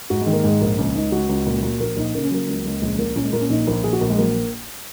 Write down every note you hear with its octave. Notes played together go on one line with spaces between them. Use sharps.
G#2 F#4
G#3
D#3
A#3
G#2 G#3
A#1 A#3
C#2 C#4
C#2 D#4
C#2 F#4
C#2
A#2
A#2
A#1 A#4
A#1 D#4
C#3 A#3
C#4
F#3 A#3
C#2
C#2
A#1 G#3
A#2 A#3
A#2 C#4
G#3
A#2 A#3
C#4
A#1 D#4
A#1 A#4
A#1 G#4
F#4
A#1 A#3
G#3
F#3 A#3